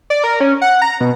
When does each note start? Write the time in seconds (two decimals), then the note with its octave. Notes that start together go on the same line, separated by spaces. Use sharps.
0.10 D5
0.24 A#4
0.40 C#4
0.62 F#5
0.82 A#5
1.00 B2